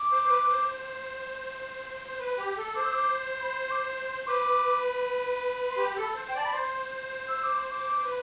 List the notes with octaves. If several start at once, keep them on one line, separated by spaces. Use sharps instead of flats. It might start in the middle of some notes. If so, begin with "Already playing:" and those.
Already playing: D6
C5
C5
B4
B4
C5
C5
B4
G4
A4
C5 D6
E6
D6
B5
C6
C6
D6
C6
C6
C6
B4 D6
C6
G4 B5
A4
C5
C5 G5
D5 A5
B5
C5 C6
E6
D6
C6
D6
C5
B4